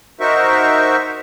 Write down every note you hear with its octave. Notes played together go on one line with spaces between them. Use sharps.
D#4 F#4 A#4 C5 E5 C#6